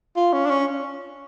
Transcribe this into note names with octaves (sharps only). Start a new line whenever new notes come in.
F4
C#4
D4
C#4